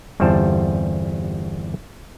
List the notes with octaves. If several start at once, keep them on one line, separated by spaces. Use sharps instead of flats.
G1 E2 G3 C4 C5 A5